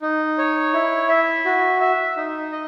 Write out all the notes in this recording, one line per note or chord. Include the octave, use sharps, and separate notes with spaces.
D#4
C#5
E4
E5
F#4
E5
D#4
D#5